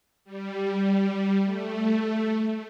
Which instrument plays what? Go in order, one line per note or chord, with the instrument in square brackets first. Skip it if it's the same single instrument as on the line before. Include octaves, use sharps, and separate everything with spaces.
[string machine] G3
A3